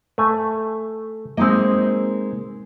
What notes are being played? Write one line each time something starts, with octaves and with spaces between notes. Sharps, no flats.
A3 G#5
G#3 A#3 C4 D#4 D#5